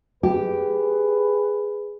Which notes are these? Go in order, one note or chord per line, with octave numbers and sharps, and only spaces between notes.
G4 G#4 B4